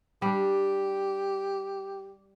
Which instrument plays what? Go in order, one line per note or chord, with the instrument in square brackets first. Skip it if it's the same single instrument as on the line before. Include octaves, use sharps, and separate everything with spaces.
[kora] G3 D4 [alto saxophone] G4